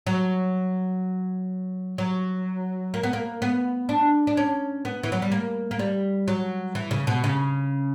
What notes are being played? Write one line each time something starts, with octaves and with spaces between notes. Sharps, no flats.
F#3
F#3
A#3
B3
A#3
B3
D4
D4
C#4
B3
E3
F#3
G3
A#3
A#3
G3
F#3
E3
C#3
B2
C#3